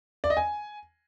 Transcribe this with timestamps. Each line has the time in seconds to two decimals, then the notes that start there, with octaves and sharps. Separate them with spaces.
0.24 D5
0.30 D#5
0.37 G#5